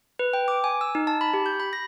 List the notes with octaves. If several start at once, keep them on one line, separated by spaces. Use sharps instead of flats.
B4
G5
D6
G#5
E6
D#4
A5
B5
G4
G6
B5
A#6